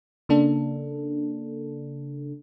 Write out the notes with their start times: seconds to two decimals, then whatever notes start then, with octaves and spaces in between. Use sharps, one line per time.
0.29 C#3 A#3 D4 A4